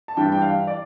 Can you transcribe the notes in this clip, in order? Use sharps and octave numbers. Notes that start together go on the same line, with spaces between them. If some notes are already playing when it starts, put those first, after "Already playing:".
A5
G2 E3 G3 D4 G5
G5
F5
D5